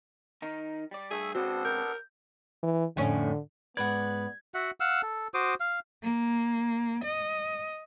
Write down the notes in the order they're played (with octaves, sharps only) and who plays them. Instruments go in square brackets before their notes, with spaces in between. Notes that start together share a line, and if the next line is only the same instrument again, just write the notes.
[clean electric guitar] D#3 D#4 A#4
G3 D5
[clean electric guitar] G2 [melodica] A3 A4 E5 [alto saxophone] G#4
[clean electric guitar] C#2 C#3 C4 [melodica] B3 D4 A4 [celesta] F#4 [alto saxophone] C5
[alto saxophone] A#4 [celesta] G6
[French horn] E3
[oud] F2 A2 C#4 [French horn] D3
[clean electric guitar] G#2 D5 [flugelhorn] B3 [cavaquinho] B4 F#5 [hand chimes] G#6
[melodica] F#4 E5 F#5
F5 F#5 E6
A4
F#4 C5 D6 D#6
F5
[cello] A#3
D#5